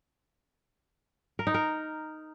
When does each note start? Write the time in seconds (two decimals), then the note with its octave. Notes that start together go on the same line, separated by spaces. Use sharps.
1.39 A#4
1.47 D#4
1.54 A#4